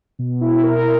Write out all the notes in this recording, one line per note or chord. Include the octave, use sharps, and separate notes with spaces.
B2
E4
A#4
A#4